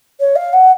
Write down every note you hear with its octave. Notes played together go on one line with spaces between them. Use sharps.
C#5
F5
F#5